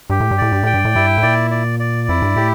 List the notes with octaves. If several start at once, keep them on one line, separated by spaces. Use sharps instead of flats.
G2 G4
A2
G2
A2 D5
G2
A2 G5
G2
A2
G2 E4
A2
A#2 D5
D5
D5
F2 E4
G2
A2 G4